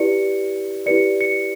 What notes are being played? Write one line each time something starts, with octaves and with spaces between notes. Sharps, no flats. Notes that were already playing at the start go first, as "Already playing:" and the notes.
Already playing: E4 G4 B4 D5 C#7
E4 G4 B4 D5 C#7
C#7